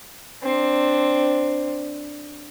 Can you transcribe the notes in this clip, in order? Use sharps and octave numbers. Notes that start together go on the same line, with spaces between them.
C4 D4